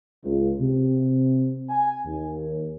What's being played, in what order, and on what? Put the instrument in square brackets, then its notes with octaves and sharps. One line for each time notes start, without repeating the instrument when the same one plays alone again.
[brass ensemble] C#2
C3
G#5
D#2